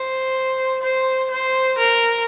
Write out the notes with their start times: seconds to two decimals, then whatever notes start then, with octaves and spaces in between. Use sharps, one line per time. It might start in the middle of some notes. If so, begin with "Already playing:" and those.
Already playing: C5
0.83 C5
1.31 C5
1.78 A#4